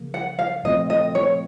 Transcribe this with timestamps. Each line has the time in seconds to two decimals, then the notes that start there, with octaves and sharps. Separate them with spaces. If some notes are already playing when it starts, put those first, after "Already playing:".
Already playing: C#3 F3 A#3
0.14 F#5
0.39 F5
0.64 A#2 F3 A3 C4 F4 D#5
0.90 D#5
1.15 C#5